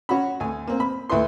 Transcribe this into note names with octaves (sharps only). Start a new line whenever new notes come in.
C#4 F#4 F#5 B5
D2 G#5
A#3 C4
B5
D2 E4 B4 C6